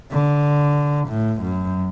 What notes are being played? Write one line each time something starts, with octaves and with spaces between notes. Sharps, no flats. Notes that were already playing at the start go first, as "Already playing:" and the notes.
D3
A2
F#2